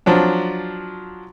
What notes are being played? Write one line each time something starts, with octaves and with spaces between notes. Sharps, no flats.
F3 F#3 D4